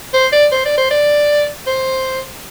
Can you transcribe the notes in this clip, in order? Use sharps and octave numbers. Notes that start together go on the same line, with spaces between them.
C5
D5
C5
D5
C5
D5
C5